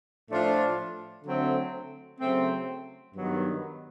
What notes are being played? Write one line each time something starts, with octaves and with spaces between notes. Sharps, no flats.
A2 F3 A3 D4 F4
D3 F#3 A3 C4
C#3 F#3 A3 C4
G2 D#3 F#3 B3